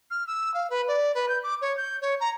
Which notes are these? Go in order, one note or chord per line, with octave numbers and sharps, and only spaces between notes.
F6
E6
F5
B4
D5
B4
G6
D6
C#5
G6
C#5
A#5